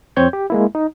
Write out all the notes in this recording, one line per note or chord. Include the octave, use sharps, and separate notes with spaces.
F2 C4 C#5 G6 G#6
G4
G#3 A#3 E4
D#4